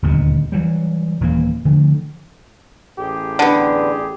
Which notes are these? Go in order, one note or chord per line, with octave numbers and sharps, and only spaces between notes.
D#1 D2 G2 B2
E3 F#3 G3
D#1 E3 A#3
D3 F3 A3
A1 G4 G#4
D3 B3